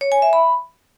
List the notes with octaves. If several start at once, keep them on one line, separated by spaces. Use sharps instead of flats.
C#5
G#5
E5
B5